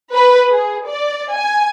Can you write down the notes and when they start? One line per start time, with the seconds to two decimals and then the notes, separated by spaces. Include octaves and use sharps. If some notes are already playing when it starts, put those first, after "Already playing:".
0.15 B4
0.50 G#4
0.87 D5
1.34 G#5